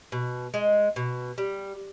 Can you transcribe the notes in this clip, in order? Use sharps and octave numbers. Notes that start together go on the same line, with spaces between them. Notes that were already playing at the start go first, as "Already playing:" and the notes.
B2
G#3
B2
G3